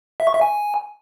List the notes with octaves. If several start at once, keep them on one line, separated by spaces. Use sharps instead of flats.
E5
C#6
E5
G#5